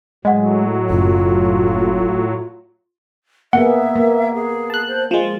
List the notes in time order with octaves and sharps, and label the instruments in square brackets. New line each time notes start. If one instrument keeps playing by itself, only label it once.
[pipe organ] A2 F#3 [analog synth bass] G#3 [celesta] D#5 F#5
[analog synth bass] F#1 [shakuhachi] F4
[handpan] A#3 B3 G#4 [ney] E5 [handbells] F#5
[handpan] A#3
[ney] G#4
[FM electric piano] A5 F#6
[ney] C5
[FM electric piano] F3 G#3 [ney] F4